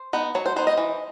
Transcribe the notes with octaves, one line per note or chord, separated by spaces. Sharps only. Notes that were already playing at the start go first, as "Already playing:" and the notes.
Already playing: C5
B3 D#4
F#3 C#5
C5
B3 D#4 C5
D#5
E3